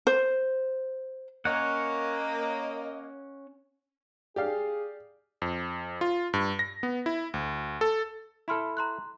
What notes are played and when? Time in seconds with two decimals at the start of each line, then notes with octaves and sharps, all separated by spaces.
0.07 C5
1.45 A#3 C#4 C#5 D#5 F#5
4.36 G4 G#4 D5 F5
5.42 F2
6.01 F4
6.34 G2
6.59 A#6
6.83 B3
7.06 E4
7.34 D2
7.81 A4
8.48 E4 A4 B5 C6 F6
8.77 A#5 C6 F#6